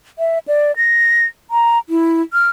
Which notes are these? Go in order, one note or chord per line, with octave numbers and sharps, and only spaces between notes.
E5
D5
A#6
A#5
E4
F6